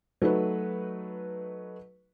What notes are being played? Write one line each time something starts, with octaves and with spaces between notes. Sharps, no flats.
F#3 A3 D#4 B4